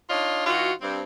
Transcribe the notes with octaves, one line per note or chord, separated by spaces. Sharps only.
D4 D#4 F4 C#5 D#5
E3 D#4 F4 F#4
G2 C4